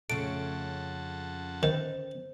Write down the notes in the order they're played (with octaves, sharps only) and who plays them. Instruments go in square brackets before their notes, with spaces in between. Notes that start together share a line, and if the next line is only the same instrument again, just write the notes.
[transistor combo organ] F2 F#5 A5 [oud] C#3 A3 [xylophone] D7
[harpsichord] D#3 [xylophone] C5